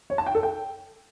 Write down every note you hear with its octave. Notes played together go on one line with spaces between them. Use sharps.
C#5
A5
G5
A4
G5